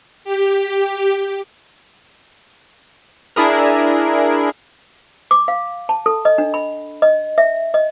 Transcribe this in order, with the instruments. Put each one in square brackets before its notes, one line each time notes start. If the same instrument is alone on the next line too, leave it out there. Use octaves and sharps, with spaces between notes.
[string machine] G4
[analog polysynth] D4 E4 G#4 A#4
[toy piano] D6
F5
A5
A4
D#5
D4
B5
D#5
E5
D#5